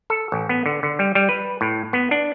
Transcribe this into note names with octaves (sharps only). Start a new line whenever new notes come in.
A4
A1
B3
D3
D3
G3
G3
B4
A2
B3
D4